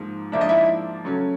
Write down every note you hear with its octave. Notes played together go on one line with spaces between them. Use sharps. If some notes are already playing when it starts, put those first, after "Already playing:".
Already playing: G#2 F3 A#3
G#2 F3 A#3 D4 E5
D#5
E4 E5
C#3 F#3 A3 C#4